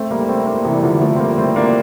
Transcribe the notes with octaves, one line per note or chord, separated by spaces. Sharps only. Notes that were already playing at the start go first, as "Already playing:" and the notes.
Already playing: A3 C4
G3 A#3
A3 C4
A#3 D4
C3 E3
G3
D3 F3
F3 A3
C4
G3 A#3
A3 C4
A#3 D4